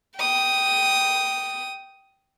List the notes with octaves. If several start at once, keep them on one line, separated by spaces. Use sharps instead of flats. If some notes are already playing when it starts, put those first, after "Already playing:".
G5 D#6